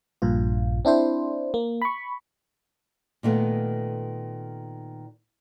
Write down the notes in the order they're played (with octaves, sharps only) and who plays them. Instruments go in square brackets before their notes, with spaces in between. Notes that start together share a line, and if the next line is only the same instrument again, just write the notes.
[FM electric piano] A#1 G2 A#2 F4
C4 D4 E4 C5
A#3
B5 C#6
[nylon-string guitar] A#2 D#3 A3 B3